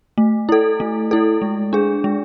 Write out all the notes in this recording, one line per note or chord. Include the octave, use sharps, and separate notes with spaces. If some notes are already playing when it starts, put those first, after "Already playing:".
A3
E4 A4
A3
E4 A4
G#3
D4 G#4
G#3